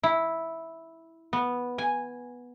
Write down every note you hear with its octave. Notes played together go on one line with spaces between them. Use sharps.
E4
B3
G#5